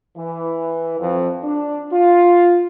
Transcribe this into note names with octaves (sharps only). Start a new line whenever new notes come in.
E3
F2
D4
F4